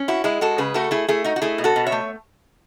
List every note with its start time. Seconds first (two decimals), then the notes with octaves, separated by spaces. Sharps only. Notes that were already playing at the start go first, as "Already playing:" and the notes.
Already playing: C#4
0.08 E4 F#4
0.24 G#3 E4 G#4
0.41 G#3 F#4 A4
0.58 C#3 G#4 B4
0.74 A3 F#4 A4
0.91 A3 E4 G#4
1.08 A3 E4 G#4
1.24 D#4 F#4
1.36 F#4
1.42 A3 E4 G#4
1.58 B2
1.64 F#4 A4
1.76 B2
1.86 C#5 E5
1.92 A3